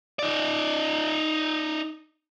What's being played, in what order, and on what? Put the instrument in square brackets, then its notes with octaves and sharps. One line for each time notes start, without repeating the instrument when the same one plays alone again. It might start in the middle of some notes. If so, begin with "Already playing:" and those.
[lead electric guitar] D#4 D5